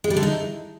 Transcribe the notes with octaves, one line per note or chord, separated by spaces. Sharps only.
G#3
G3
D3
D#4